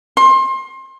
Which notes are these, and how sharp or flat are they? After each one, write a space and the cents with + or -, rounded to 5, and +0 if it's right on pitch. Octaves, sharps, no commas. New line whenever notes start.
C6 +30